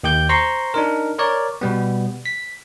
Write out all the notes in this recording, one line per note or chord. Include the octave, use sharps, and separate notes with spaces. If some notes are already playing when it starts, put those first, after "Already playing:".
D#2 G4 D6 G6
C5 A#5 C6 C#6
D4 D#4 A#4
A#4 C#5 D5
B2 G3 B3
B6